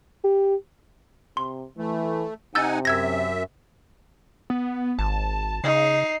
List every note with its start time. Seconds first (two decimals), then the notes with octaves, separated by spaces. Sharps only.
0.24 G4
1.37 C3 C6
1.78 E3 A3
2.55 C3 D#4 F#5 G#5 E6 G6 A6
2.85 F#2 E5 E6 G#6 A#6
4.50 B3
4.99 G#1 A5
5.64 C#3 D#4 C7